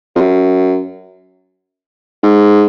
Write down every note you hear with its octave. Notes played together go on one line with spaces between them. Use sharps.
F2
F#2
G#2